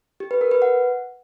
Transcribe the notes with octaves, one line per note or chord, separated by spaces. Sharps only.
G4
B4
A#4
B4
F#5